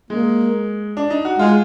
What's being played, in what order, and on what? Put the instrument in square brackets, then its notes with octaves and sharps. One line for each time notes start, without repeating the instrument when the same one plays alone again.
[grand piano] G#3 [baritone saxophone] A#3
[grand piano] D4
D#4
F#4
[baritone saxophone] G#3 [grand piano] F4